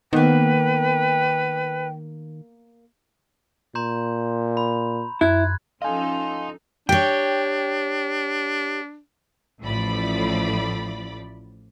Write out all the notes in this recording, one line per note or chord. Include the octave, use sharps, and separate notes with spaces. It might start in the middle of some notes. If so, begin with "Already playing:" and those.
D#3 A#3 B3 B4 G5
A#2 A#5 C6 G6
B5
F#2 E4 F#6 G#6
F3 C#4 D#4 A4 D#5 F5 G#5 C6
D4 G4 C#5 G5
A1 A2 F3 D5 B5